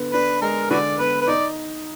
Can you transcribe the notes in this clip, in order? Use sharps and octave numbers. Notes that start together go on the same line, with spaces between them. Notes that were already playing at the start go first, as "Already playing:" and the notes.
Already playing: D3 B3
D4 B4
G#3 A#4
D3 F#4 B4 D5
B3 B4
B4
D#4 D5